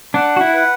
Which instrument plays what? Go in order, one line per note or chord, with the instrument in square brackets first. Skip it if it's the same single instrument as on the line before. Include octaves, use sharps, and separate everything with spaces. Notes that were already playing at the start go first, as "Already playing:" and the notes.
[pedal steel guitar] D4 [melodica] F#5
[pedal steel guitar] F#4
E4
[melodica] B4